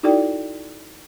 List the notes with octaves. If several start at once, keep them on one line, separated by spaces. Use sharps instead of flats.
D#4 E4 F#4 A4 D5 G5